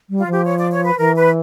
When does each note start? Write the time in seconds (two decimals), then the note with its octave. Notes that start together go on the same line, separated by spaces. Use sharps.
0.10 G3
0.18 F4
0.27 F3 G4
0.45 C#5
0.58 D5
0.71 C#5
0.85 B4
0.98 E3 A#4
1.16 B4